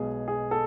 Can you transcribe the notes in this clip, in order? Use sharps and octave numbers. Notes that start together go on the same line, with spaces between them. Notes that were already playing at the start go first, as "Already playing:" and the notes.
Already playing: B1 B2 G#3 G#4
G#4
A4